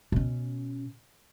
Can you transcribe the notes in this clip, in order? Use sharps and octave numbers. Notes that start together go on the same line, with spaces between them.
B2 C#4